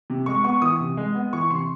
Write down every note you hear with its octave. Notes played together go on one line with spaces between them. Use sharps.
C3
G#3 C#6
B3 C#6
E3 D#6
C3
G#3
B3
E3 C#6
C3 C6